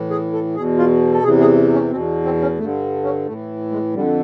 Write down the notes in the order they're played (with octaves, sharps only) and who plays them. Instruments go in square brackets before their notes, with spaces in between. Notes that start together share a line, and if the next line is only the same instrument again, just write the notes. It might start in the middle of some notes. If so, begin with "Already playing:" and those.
Already playing: [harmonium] A2 E3
G#4
A4
E2 B2 G#4
F4
A4
E2 C3 E3 G#4
G#4
C#4
B2 C4
E2
C4
C#4
G2 D3 A3
C#4
A2 A3
E3
G#3
F2 D3 G3